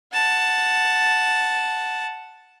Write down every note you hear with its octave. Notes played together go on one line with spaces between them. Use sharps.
F#5 A5